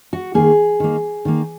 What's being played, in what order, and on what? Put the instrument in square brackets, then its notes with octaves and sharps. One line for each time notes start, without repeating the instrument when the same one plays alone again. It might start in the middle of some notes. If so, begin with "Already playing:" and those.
[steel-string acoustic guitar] F#4
D#3 A#3 G#4
D#3 A#3
D#3 A#3